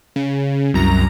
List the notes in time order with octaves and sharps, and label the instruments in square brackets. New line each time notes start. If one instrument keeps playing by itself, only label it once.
[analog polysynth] C#3
C2 F#2 A#5